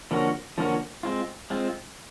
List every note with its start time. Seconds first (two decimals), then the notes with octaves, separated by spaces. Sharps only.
0.11 D3 F3 A#3 C#4 F#4
0.58 D3 F3 A#3 C#4 F#4
1.03 G#3 C4 F4
1.50 G#3 C4 F4